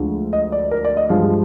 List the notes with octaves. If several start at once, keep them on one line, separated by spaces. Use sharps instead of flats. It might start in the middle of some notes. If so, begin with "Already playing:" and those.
Already playing: D2 D3 F3 G#3
D#5
D5
A#4
D5
D#5
G2 F3 G#3 F5